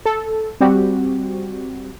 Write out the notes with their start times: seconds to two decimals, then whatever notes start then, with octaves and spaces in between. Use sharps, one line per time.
0.06 A4
0.61 G3 C4 F#4 G4